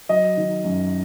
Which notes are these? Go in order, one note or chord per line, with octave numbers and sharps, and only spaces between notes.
F#3 D#5
D#3
F#2